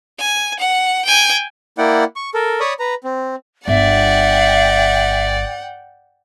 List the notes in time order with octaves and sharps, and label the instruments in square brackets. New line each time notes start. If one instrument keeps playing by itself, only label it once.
[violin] G#5
F#5
G5 G#5
[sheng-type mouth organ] A#3 E4 D5 F#5 G5
C#6
A4 A#4
C#5 D5 B5 C#6 D#6
B4 A#5
C4
[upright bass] G1 [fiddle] D5 [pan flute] E5 [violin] F#5 G5